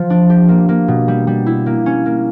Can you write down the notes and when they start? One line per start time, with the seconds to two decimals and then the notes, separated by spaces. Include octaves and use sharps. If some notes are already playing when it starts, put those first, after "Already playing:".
Already playing: F3
0.10 D4
0.30 G4
0.49 A#3
0.69 A#3
0.88 B2
1.08 G3
1.27 G3
1.46 E4
1.66 A#3
1.86 C#4
2.06 A#3